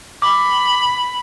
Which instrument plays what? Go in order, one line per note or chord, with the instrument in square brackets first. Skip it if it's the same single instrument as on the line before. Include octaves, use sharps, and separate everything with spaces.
[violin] B5 [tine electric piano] D6